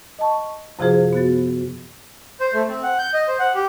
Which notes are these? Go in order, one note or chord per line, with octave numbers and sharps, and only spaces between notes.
D#5 A5 C#6
F#2 C3 F3 F4 G#4 C5
B3 F#4 A6
C5
A3
C4
F#5
G6
D#5
C5
F#5
G4